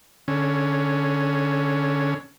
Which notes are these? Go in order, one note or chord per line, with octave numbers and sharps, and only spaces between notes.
D3 C#4